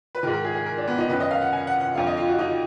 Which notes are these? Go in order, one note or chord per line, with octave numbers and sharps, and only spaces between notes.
B4
G#2 D#3 A#4
A#4
G#4
G#4
A#4
D4
B3
D#4
F#2 D#3 B4
D#5
F5
F#5
G#5
F#5
F#5
F2 D3 F5
D#5
F4
F#4
D#4